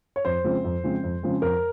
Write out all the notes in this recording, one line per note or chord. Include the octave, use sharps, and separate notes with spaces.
C#5
F2 C5
C#3 F3 G#3 C4
F2
C#3 F3 G#3 C4
F2
C#3 F3 G#3 C4
F2 A#4